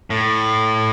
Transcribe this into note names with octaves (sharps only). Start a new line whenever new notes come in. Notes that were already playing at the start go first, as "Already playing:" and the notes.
A2